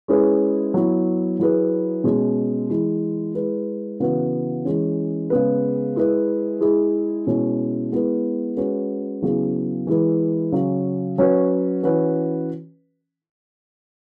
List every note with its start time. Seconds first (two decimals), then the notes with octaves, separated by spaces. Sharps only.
0.08 G#3 C#4 E4 G#4 B4
0.74 F#3 B3 E4
1.39 F#3 E4 G#4 B4
2.04 B2 G#3 C#4
2.69 E3 G#3 E4
3.35 G#3 E4 B4
4.00 C#3 E3 B3 F#4 B4
4.65 E3 G#3 C#4
5.30 C#3 G#3 B3 G#4 B4
5.96 G#3 E4 G#4 B4
6.61 G#3 E4 G#4
7.27 B2 G#3 C#4 E4
7.92 G#3 B3 E4 B4
8.57 G#3 C#4 F#4 B4
9.22 C#3 F#3 B3 E4 G#4
9.87 E3 G#3 E4 B4
10.52 C#3 F#3 C#4
11.18 F#3 C#4 F#4 B4
11.83 E3 C#4 F#4 B4